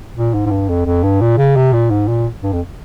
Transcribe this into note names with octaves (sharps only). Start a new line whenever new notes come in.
A#2
G#2
G#2
G2
F2
F2
G2
A#2
C#3
C3
A#2
G#2
A#2
G2
F2